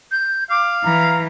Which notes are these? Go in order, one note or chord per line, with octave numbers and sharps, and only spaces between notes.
G6
F5 D6
E3 A#5